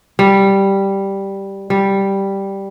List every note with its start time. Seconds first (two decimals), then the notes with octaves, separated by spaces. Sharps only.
0.19 G3
1.70 G3